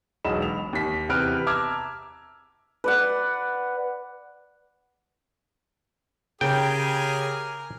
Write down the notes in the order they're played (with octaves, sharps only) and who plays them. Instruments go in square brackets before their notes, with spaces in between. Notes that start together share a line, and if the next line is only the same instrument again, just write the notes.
[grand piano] E1 B1 G#3 D#5 B5 E7
F7
D#2 B6
E2 C3 B4 F6 D7
A5 A#5 D6 E6 F6 G#6
[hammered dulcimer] B4 D5 F#5
[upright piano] C#3 [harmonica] G4 G#4 G#5 [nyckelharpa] A#4 [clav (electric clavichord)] G5